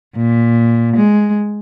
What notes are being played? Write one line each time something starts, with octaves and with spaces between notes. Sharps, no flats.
A#2
G#3